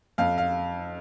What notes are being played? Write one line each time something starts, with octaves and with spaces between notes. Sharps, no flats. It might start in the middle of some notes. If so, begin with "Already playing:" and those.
F2 F5
F5